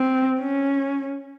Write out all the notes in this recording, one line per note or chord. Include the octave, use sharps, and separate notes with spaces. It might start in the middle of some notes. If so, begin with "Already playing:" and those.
Already playing: C4
C#4